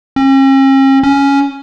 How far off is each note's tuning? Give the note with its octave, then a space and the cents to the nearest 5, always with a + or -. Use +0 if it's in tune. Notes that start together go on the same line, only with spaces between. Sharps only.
C#4 -45
C#4 +5